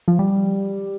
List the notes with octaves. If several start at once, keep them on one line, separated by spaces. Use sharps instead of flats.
F3
G3